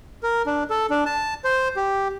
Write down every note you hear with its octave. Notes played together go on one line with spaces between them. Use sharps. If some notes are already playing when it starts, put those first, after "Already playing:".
A#4
D4
A4
D4
A5
C5
G4